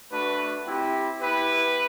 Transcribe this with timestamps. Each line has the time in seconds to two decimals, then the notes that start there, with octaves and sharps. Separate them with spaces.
0.11 A3 D4 F#4 B4
0.66 C4 E4 G4
1.21 B3 E4 G4 B4